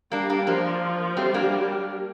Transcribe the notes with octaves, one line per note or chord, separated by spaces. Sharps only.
G3 A#3 D4
A#3 D4
F3 A#3 D4
G3 A3 C4
A#3 D4